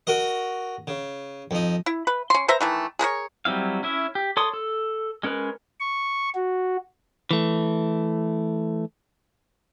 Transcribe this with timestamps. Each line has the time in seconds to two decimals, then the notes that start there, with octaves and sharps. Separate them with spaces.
0.07 F#4 A#4 D#5
0.87 C#3
1.51 F2 D#4
1.86 E4
2.07 B4
2.30 C#4 C6
2.48 B4 C5 E5 A#5
2.61 D#3 E3 A3
2.99 G#4 A#4 B4 C#5
3.45 F#3 G3 C4 E4 F5
3.83 C#4 E4 E5
4.15 G4
4.37 A4 C#5 C6 D#6
4.53 A4
5.23 G#3 C#4 A#4 B4
5.80 C#6
6.35 F#4
7.31 E3 A3